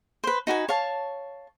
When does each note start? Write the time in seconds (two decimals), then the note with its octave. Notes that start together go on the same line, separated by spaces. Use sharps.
0.24 B4 C5
0.47 D#4 F#4 B4 G#5
0.69 C#5 F5 A5